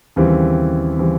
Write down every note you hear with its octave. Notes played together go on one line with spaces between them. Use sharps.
D#2 C#3 E3 G3 C4
C#3 E3 G3 C4